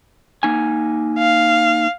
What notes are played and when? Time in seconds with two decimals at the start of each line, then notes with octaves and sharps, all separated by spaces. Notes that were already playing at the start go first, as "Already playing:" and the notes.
0.43 A#3 D#4 G#5
1.18 F5